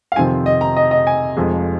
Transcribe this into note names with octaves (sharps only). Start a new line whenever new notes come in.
F5
F2 C3 D#3 C4 F4 G#5
D#5
A#5
D#5
D#5
G#5
F1 F2 F3 G#3